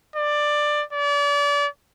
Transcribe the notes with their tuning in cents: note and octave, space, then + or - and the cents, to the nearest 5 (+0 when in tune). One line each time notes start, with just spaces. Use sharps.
D5 +15
D5 -35